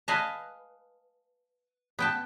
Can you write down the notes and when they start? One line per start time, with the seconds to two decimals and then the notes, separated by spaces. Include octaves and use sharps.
0.08 B4 D#5 F5 G#5 A5
1.99 B3 G5 A5